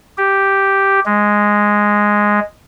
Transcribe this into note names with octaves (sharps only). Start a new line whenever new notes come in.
G4
G#3